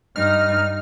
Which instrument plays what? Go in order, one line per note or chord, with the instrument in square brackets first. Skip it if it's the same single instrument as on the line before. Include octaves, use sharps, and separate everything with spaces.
[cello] G2 D#4 [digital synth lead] F6